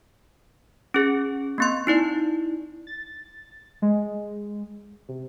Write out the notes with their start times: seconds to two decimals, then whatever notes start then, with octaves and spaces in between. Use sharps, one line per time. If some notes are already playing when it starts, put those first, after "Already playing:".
0.94 C#4 G#4
1.58 A#3 C4 C6
1.87 D#4 E4 D5
2.87 A6
3.82 G#3
5.09 C3